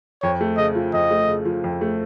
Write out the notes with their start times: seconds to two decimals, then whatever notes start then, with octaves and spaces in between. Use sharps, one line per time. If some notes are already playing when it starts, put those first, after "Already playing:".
0.22 F2 C#5
0.41 A3
0.57 C#3 D#5
0.75 F3
0.93 F2 D#5
1.11 A3
1.28 C#3
1.45 F3
1.64 F2
1.81 A3